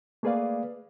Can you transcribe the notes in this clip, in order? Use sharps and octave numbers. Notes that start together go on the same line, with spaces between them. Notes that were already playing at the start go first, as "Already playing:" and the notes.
A3 A#3 G#4 B4 D5 F5